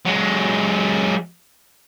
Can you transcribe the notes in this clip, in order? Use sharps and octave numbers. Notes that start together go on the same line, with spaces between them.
F#3 G#3